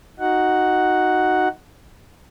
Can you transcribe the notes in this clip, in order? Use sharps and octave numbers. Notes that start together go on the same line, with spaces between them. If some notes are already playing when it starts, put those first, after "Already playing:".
D#4 F#4 F#5